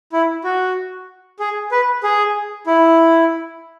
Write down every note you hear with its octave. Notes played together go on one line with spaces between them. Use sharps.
E4
F#4
G#4
B4
G#4
E4